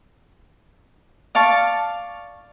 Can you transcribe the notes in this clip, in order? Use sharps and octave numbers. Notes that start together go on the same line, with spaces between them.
D5 F5 A5 C#6